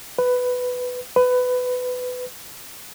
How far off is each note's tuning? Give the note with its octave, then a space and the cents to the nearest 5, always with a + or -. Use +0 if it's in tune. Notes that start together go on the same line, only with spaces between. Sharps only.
B4 +10
B4 +20